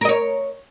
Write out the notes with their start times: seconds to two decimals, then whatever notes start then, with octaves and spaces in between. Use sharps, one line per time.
0.01 A#4
0.05 D#5
0.09 C#5